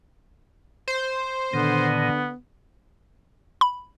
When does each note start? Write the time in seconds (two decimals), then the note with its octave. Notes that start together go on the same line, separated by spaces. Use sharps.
0.88 C5
1.54 A#2 D3 D#3 B3
3.61 B5